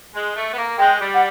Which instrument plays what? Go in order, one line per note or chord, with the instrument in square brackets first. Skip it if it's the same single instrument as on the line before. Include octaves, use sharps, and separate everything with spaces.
[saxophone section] G#3
A3
B3
A#3
[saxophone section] G#3 [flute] G5
[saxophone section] G3
[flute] F#5